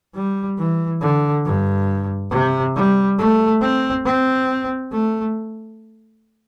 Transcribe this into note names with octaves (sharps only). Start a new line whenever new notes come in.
G3
E3
D3
G2
C3
G3
A3
C4
C4
A3